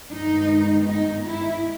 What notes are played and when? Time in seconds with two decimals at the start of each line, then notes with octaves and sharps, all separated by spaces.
0.11 G2 D#3 G#3 B3 D#4
0.87 D#4
1.26 E4